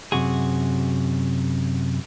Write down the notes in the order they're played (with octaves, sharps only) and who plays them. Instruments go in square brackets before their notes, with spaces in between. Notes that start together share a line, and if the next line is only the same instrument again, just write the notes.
[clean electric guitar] F#2 C3 F#4 G#4